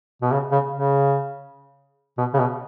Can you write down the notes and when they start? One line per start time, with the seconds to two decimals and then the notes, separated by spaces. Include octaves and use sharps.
0.22 B2
0.31 C#3
0.51 C#3
0.72 C#3
2.17 B2
2.33 C#3
2.39 B2